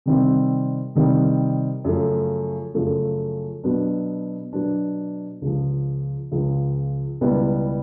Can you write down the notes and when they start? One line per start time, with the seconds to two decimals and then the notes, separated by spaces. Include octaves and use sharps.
0.06 C3 D#3 G3 C4
0.95 C3 D#3 G3 C4
1.85 F#2 C#3 F3 A3
2.74 F#2 C#3 F3 A3
3.63 B2 F#3 B3 D4
4.53 B2 F#3 B3 D4
5.42 C#2 C#3 F3
6.32 C#2 C#3 F3
7.21 C#2 B2 G3 B3 E4